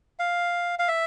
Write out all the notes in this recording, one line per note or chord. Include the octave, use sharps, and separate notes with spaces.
F5
F5
E5